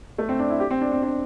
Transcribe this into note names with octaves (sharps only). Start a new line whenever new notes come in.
A3
C4
D4
E4
G4
C4
D4
C4
D4